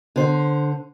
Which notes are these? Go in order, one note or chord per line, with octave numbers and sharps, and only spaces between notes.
D3 C5